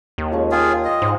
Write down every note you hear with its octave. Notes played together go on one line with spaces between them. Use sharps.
D#2
F3 G#3 C#4
F4 G#4 G5 C6
D#5
G#2 C5 F5